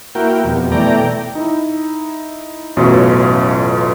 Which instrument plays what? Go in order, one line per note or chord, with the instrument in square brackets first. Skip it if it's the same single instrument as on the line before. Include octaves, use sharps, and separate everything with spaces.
[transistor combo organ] A#3 E4 F#4 A#4 G5
F2 B2 G3
B2 E3 A3 D5 G5 A#5
[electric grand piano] D#4 E4
A1 F#2 B2 A3 F4 C#5